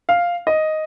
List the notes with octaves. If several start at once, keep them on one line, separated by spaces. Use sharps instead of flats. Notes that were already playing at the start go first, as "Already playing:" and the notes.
F5
D#5